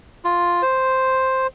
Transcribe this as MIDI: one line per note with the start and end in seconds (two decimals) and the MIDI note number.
0.24 0.62 65
0.62 1.47 72